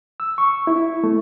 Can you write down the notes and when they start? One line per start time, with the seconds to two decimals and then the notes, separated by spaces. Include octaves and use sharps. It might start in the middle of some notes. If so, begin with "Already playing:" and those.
0.20 E6
0.38 C#6
0.67 E4
1.04 A3